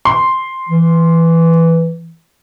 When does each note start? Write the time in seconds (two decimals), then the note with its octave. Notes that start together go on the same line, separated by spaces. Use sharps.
0.05 C6
0.69 E3